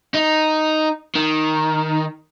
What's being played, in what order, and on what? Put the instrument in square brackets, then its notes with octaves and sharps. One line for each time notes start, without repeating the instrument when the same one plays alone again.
[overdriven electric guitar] D#4
D#3